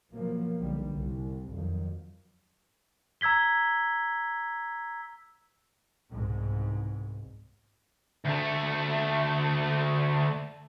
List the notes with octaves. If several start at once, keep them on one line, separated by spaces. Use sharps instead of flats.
B2 F3 F#3 A#3
B1 D3 G3
C2
F2 D#3 F3 F#3
A#5 E6 G#6 B6 G7
C2 G#2 B2
D2 A3